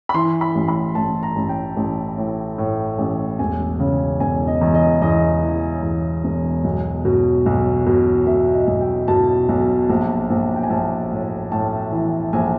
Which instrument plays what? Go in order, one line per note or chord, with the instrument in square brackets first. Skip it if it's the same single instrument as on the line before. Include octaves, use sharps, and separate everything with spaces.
[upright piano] B5
E3 C6
B5
A1
B5
A1 A5
A#5
A1
G5
A1
A2
A2
A1
E1 G#5
C#3
E1 G#5
D#5
E2
D#5
E2 D#5
E3
E2
E1
B1
B2
B1
B2
B2 E5
D#5
B1
G5
B2 A5
B1
A#1
A#1
G5
G#5
A#1 A5
A2
A2 A5
E3
A#1 G#5